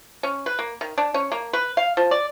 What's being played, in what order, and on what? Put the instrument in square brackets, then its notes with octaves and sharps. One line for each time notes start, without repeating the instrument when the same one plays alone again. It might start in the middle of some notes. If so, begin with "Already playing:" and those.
[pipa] C#4
B4
A#3
D#3
D4
C#4
A#3
B4
F5
F3
D5